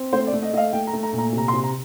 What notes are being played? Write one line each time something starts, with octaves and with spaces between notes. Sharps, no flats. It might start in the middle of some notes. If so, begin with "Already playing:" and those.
Already playing: C4
A3 C5
D5
A3
D#5
A3 D#5 F5
A3 G5
A#5
A3
A#5
A#2
A#5
C3 A#5
C6
C3
A#5